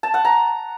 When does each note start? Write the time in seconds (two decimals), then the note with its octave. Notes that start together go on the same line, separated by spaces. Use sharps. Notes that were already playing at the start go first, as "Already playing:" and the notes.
0.03 A5
0.14 F#5
0.25 A#5